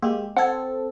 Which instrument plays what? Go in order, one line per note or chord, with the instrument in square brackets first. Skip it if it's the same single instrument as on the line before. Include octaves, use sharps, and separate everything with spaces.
[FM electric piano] G#3 G4 [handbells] A#3
[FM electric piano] C4 A4 [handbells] F#5 G#6